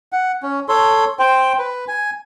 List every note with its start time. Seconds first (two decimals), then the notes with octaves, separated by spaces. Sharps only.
0.13 F#5
0.43 C#4
0.68 A4 C#5 C6
1.19 C5 G5
1.59 B4
1.88 G#5